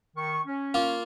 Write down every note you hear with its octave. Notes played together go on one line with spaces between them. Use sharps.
D#3 C#6
C#4
A#3 F4